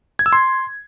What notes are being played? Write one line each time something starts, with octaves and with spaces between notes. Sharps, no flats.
G#6
E6
C6